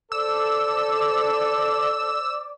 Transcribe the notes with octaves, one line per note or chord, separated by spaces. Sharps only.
A4 C5 D5 D6 E6